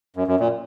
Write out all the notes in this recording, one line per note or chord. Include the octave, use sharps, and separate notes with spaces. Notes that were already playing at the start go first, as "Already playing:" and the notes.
F#2
F#2
A#2